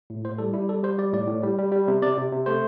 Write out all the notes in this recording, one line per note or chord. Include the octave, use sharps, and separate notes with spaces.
A2
A2 C5
G3 A4
G3 E4
G3 A4
G3 C5
G3 D5
A2 D5
A2
G3
G3
G3
C3
C3 D5
C3
C3
A3 C5